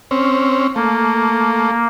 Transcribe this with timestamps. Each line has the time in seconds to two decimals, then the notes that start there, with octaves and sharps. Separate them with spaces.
0.11 C4 C#4
0.76 A3 A#3